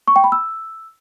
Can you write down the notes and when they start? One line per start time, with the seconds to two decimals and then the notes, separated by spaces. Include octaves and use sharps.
0.08 C#6
0.16 G5
0.24 B5
0.32 E6